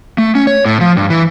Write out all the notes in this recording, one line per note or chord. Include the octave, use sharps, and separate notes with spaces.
A3
C#4
C#5
A2
F3
G2
E3